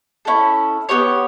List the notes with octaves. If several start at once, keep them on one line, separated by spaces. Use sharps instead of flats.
C#4 E4 A4
B3 D4 G4 C#5